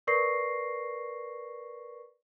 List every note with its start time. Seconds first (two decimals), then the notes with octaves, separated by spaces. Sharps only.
0.07 A#4 B4 D5 C#6 A#6 C7